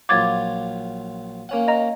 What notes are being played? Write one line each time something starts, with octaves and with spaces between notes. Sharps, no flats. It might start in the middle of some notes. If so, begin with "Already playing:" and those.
A#1 F#3 F4 D6 G#6 A6
A#3 C#4 F#5
D#5 A#5